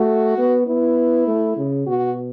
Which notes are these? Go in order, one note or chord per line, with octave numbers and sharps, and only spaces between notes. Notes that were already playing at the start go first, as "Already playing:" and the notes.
Already playing: A3 F#4
B3
B3 E4
A3
C#3
B2 F#4